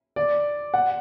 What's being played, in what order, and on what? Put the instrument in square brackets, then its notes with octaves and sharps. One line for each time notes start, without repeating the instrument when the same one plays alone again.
[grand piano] D5
F#5